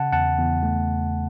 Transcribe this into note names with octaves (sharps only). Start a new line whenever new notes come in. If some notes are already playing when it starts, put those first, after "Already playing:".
Already playing: C#3 F#5 A5
E2 F#5 A5
E2
A3